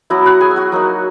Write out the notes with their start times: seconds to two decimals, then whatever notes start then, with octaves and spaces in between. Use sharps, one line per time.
0.10 F#3 B3 E4 F#4 F#5
0.26 F#4 F#5
0.41 G#4 G#5
0.51 E5
0.56 F#4 F#5
0.72 F#3 A#3 D#4